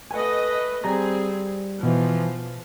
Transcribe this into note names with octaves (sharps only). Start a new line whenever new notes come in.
A3 B4 D#5 F#5 G#5
G3 C4 G#4 A#5
B2 E3 F3